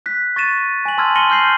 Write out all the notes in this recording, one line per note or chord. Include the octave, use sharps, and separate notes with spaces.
F#6 B6
C#6 A6 A#6 D#7 E7
G#5 F#7
A5 C6 E6 F6 G#6 D#7
C6 A#6 C#7 D#7 F#7 G7
F6 G6 C7 F#7